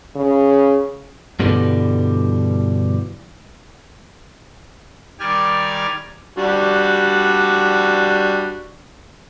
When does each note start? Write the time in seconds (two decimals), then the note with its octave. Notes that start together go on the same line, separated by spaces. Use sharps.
0.16 C#3
1.40 G2 B2 D3 E3 G3
5.20 D#3 G3 G4 D5 G#5 F6
6.37 G3 D4 F#4